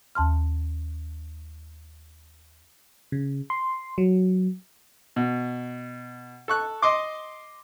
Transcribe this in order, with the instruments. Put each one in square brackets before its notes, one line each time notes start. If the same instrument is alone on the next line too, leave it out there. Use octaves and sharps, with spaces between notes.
[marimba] D#2 A5 C6 F6
[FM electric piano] C#3
C6
F#3
[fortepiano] B2
A4 C#6 F#6
D#5 C6 D6